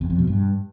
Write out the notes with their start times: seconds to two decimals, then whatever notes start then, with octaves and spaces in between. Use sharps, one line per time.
0.01 E2
0.10 F2
0.18 B2
0.27 G2